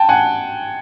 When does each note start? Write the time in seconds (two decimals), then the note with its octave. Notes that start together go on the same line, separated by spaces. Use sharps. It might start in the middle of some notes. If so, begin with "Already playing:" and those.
Already playing: G5 A5
0.09 F#5 G#5